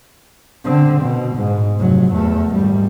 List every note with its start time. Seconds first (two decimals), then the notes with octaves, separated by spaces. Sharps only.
0.65 D3 C4
1.01 B2
1.36 G#2
1.79 F1 F#3
2.12 E2 A3
2.54 G#1 G3